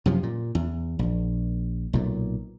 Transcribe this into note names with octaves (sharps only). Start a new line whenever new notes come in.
F#2 C3 F3
A#2
E2
A#1
B1 A#2